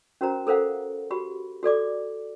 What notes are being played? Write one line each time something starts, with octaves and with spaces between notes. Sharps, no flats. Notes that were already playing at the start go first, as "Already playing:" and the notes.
C#4 F#4 A#4 C5 A#5
A4 A#4 C5 F5 F#5
F#4 G4 B5
F#4 A4 D5 D6